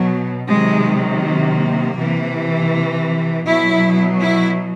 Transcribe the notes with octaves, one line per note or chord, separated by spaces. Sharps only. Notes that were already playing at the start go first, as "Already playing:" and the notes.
Already playing: B2 F#3
C3 D#3 F#3 G#3
A#3
C3 E3
B2 F#3 E4
E4